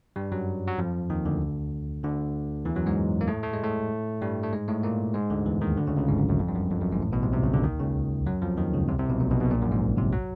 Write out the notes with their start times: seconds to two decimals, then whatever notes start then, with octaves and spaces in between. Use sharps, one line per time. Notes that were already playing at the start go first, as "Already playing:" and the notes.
0.16 G2 G3
0.32 F#2 F#3
0.68 F#3
0.79 F2 F3
1.10 D#2 D#3
1.25 D2 D3
2.03 D2 D3
2.65 E2 E3
2.75 F#2 F#3
2.86 G#2 G#3
3.21 A#3
3.28 A2 A3
3.43 A3
3.53 G#3
3.64 A2 A3
4.21 G2 G3
4.43 A3
4.53 G#2 G#3
4.68 A2 A3
4.83 A#2 A#3
5.14 G#2 G#3
5.30 D2 D3
5.46 E2 E3
5.61 D#2 D#3
5.77 D2 D3
5.87 C#2 C#3
5.97 C#2 C#3
6.08 G#1 G#2
6.18 F#2
6.29 F#2
6.39 F2
6.49 G2
6.55 F#2
6.70 F2
6.81 F#2
6.91 G#1 G#2
7.02 A1 A2
7.12 B1 B2
7.22 C2 C3
7.33 C2 C3
7.43 C#2 C#3
7.54 D2 D3
7.64 D#2 D#3
7.80 C#2 C#3
8.26 F#2 F#3
8.42 F2 F3
8.57 D#2 D#3
8.73 C#2 C#3
8.89 C2 C3
8.99 C2 C3
9.09 B1 B2
9.20 A#1 A#2
9.30 B1 B2
9.40 B1 B2
9.51 A#1 A#2
9.62 F#2
9.71 G#1 G#2
9.97 C2 C3
10.13 F#3